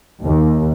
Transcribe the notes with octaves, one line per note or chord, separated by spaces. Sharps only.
D#2